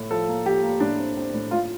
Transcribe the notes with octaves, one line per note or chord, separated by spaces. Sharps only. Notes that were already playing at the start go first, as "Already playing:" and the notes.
Already playing: A2
F3 A4
A#3
F3 G4
A#3
A2 D4
C4
C4
A2
A2 F4